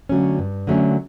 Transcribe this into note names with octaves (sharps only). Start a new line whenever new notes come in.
D3 F#3 A3 C#4
G2
D3 F#3 A3 C#4